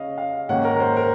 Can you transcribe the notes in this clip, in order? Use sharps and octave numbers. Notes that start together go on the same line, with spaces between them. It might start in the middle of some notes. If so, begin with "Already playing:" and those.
Already playing: C#3 C#4 D#5 F5
F5
G#2 D#3 A#3 C#4 F#5
A#4
A#4
C5
A#4